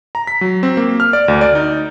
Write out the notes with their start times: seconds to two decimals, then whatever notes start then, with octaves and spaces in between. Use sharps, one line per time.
0.15 A#5
0.27 B6
0.41 F#3
0.63 C4
0.77 A#3
1.00 F6
1.13 D5
1.28 D2
1.41 D5
1.55 D#4